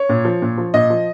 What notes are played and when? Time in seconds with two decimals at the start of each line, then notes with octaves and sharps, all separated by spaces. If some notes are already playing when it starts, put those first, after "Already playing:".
Already playing: C#5
0.09 A#2
0.25 F3
0.42 A#2
0.58 F3
0.74 A#2 D#5
0.90 F3